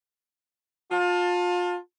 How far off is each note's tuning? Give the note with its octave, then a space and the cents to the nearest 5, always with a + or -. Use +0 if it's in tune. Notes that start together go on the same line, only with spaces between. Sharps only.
F4 +30 A5 +10